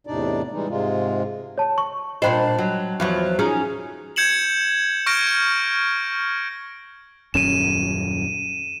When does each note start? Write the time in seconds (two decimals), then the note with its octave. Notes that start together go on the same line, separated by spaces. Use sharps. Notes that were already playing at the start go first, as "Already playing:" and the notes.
0.07 E2 A2 C3 D4 D#4 D5
0.52 E3 G3 G#3 D#4
0.68 G#2 C3 G#3 F4
1.58 C#5 A5
1.78 C#6
2.22 A#2 D4 C5 D#5 G5 B5
2.58 F#3
3.00 E2 F3 F#3
3.39 C#4 D#4 G#4
4.16 G6 G#6 C#7 E7 F#7
5.06 C#6 F6 G6 A#6 D7
7.34 D#1 F#2 C#4 D#7 E7